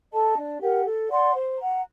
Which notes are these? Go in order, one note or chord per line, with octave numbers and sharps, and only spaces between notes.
A4 D#5 A5
D4
G4 A#4 F#5
A4
D5 F#5 C6
C5
F#5 A#5